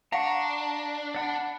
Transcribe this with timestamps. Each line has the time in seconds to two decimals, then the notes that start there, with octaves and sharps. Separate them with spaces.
0.12 D4 F5 F#5 A#5 C#6
1.15 D5 F#5 B5